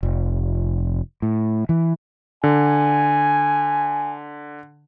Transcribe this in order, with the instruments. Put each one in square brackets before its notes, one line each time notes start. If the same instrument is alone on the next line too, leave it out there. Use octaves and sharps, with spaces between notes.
[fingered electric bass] F1
A2
E3
[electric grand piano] D3 [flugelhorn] G#5